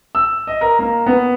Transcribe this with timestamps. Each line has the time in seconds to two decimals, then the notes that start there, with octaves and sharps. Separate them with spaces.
0.15 E6
0.47 D#5
0.61 A#4
0.79 A#3
1.06 B3